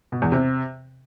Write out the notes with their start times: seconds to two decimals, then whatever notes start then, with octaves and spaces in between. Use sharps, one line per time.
0.12 B2
0.22 E2
0.32 C3